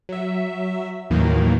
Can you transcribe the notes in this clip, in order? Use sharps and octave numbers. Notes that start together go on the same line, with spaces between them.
F#3 E5
D#2 A2 D#3 E3 F#3 A#3